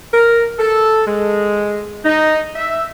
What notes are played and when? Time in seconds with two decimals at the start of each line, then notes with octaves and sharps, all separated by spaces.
0.14 A#4
0.59 A4
1.08 G#3
2.05 D#4
2.56 E5